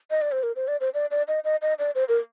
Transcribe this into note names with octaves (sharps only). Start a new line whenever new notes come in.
D#5
D5
C5
A#4
C5
D5
C5
D5
D5
D#5
D#5
D#5
D5
C5
A#4